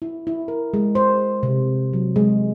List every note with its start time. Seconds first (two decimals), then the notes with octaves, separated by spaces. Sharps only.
0.02 E4
0.27 E4
0.48 A#4
0.74 G#3
0.95 C5
1.43 C3
1.93 F#3
2.16 G#3